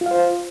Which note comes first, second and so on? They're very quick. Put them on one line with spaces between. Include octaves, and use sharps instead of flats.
F4 F5 C5